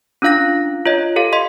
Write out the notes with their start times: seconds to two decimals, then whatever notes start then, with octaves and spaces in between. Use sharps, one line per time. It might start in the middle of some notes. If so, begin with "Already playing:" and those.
0.22 C#4 D4 F4 F5 F#6 A#6
0.86 F4 C#5 D#5
1.16 G4 A4 F5
1.33 D#5 C6 B6